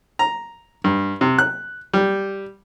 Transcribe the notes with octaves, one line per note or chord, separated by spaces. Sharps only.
A#5
G2
C3
F#6
G3